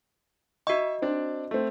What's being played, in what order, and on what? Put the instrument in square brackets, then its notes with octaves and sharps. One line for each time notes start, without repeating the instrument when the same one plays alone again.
[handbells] F#4 D#5 [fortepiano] E5 C#6
[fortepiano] C4 D4 D5
A3 C4